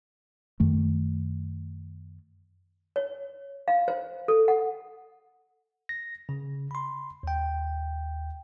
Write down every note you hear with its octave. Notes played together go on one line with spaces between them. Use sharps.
F#2 D#3 A3
C#5
F5
C5
A4
F#5
A#6
C#3
B5 C6
D#2 G5